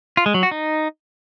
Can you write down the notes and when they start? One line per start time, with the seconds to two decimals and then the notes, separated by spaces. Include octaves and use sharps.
0.17 F4
0.26 G#3
0.34 F#3
0.43 F#4
0.51 D#4